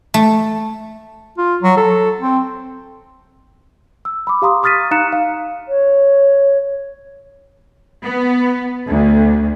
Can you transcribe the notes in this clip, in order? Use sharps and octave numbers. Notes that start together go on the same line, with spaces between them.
A3
F4
F#3
A4
C4
E6
B5 D6
G4 F5 A#5 C6 D#6
C#6 D#6 F6 A6 B6 D#7
D#4 F5 A#5 F#6 C#7 E7
F5
C#5
B3
D2